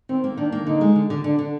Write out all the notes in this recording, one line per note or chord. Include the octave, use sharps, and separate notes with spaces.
D#3 C4
A#3
D#3 D4
A#3
D3 D#4
G#3
D3
D3
D3 D4
D3